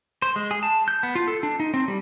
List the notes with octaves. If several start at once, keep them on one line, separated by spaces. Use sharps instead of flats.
C5
G#3
G#4
A5
G6
B3
F4
A4
D4
D#4
C4
G3